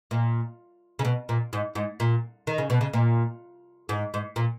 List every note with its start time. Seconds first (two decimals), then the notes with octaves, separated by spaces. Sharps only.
0.11 A#2
0.99 C#3
1.05 B2
1.29 A#2
1.53 G#2
1.75 G#2
2.00 A#2
2.47 D#3
2.58 C#3
2.70 B2
2.81 C#3
2.93 A#2
3.89 G#2
4.14 G#2
4.36 A#2